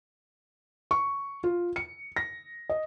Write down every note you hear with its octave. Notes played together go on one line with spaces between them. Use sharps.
C#6
F4
C#7
A#6
D#5